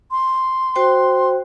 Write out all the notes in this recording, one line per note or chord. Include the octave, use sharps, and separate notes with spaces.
C6
F#4 C5 G5